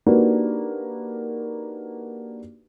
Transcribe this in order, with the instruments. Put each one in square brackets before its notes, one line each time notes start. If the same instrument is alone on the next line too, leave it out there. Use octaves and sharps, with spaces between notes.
[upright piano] A#3 D4 D#4 F#4 G4 B4